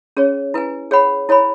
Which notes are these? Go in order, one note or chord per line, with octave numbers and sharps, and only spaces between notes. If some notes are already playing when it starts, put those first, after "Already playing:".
C#4 G#4 C#5
E4 B4 G#5
G#4 C#5 F#5 B5
E4 C#5 G#5 B5